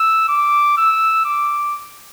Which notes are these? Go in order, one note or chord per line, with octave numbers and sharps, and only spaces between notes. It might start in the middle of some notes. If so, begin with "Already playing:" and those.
Already playing: E6
D6
E6
D6